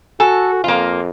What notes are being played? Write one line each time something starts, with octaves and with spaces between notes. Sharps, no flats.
F#4 A4 G#5
F2 A#3 F4